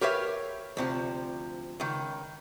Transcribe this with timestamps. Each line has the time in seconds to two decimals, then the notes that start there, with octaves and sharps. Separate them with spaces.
0.01 G4 A#4 B4 C#5 E5 F5
0.77 D2 C3 F3
1.80 C#2 D#3